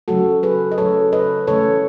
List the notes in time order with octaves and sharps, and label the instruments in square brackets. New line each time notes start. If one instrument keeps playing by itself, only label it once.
[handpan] C#3 F#3 A3 F#4 A4
G#4 B4
D#5
C#3 F#3 A3 A4 C#5
B4 D#5
C#3 E3 A3 A4 C#5